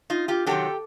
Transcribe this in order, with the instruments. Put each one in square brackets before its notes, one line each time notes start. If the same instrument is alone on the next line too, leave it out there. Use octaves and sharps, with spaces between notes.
[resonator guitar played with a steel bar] D#4 F4
F4 G4
C3 D#3 F#3 G4 A4